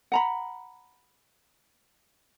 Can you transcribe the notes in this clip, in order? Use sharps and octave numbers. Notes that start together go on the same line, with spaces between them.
F#5 A#5 B5